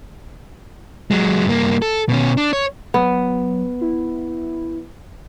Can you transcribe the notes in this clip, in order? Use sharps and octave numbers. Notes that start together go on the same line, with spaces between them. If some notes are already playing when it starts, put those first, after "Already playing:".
F#3 G#3
G2 A#3
A4
B2 C#4
D4
C#5
F#3 B3
E4